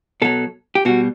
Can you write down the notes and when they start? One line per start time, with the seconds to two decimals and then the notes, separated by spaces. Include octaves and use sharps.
0.22 B2 F#3 A4
0.75 G4
0.85 B2 G3 F#4